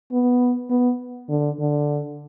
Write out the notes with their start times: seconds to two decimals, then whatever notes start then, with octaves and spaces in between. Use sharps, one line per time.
0.12 B3
0.70 B3
1.29 D3
1.59 D3